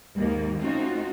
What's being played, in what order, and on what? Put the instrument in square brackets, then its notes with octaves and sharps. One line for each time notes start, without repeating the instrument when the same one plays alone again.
[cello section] D#2 G#2 D#3 A#3
A3 C4 C#4 D#4 F4 F#4